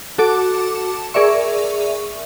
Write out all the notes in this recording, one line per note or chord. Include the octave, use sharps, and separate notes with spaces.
F#4 A4 A5 D6
G#4 A#4 D5 E5 C#6